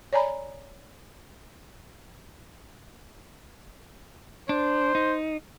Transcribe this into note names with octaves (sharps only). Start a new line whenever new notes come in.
C#5 D5 G#5 A#5 B5
D4 C5
D#4